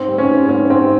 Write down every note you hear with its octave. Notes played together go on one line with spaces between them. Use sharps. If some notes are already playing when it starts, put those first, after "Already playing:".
Already playing: G#2 C4
G3
C#4
G#2
G3 C#4
G#2 C4